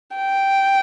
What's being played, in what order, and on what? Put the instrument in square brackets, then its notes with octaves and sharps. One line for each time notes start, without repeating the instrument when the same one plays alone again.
[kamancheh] G5